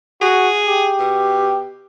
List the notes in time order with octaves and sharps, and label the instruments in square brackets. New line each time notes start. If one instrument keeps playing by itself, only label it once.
[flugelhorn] F#4 [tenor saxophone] G#4
[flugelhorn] G4
[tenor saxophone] B2